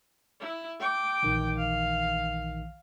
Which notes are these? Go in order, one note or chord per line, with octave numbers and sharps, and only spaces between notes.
E4
G5 D6
A#1 D#3 E3
F5